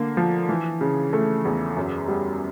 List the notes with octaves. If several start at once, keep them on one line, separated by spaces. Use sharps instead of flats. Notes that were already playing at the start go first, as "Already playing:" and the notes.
Already playing: D3 A#3
F3
E3
C#3
A3
E2
F#2
G3